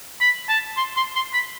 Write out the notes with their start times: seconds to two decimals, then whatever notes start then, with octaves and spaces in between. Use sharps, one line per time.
0.21 B5
0.49 A5
0.77 C6
0.96 C6
1.15 C6
1.33 B5